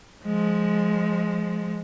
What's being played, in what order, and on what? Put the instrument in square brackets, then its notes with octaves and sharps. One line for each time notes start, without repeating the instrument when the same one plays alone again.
[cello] F3 G#3